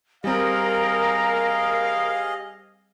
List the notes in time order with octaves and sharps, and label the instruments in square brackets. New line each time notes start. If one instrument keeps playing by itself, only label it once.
[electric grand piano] G3 C4 [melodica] G#4 D#5 [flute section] A#4 [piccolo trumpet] F5